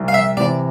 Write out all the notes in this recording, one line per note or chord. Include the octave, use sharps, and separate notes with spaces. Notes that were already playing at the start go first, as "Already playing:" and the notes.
Already playing: C2
F5
E5
C3 E3 D5